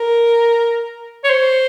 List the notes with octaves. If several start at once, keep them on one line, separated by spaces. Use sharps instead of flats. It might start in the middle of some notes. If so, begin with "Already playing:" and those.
Already playing: A#4
C#5
C5